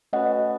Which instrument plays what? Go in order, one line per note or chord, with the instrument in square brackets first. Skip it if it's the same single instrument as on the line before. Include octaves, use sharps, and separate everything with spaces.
[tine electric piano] A3 C#4 F#4 B4 [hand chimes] D#5 F#5